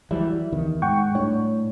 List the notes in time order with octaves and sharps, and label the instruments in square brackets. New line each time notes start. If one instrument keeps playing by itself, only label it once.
[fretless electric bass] E3 F#3 G3 [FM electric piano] E4
[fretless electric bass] E2 D#3
[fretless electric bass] G#2 [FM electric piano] F#5 G5 C#6
[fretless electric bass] A2 [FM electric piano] G3 D4 C#5